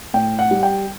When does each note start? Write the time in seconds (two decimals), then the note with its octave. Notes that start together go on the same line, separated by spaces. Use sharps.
0.14 A2 G5
0.39 F#5
0.51 G3
0.63 G5